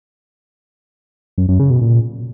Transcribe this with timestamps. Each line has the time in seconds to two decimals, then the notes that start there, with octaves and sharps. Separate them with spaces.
1.38 F#2
1.49 F#2
1.59 C#3
1.70 B2
1.81 A#2